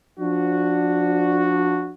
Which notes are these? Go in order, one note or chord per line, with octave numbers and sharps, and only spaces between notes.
F3 D4 F#4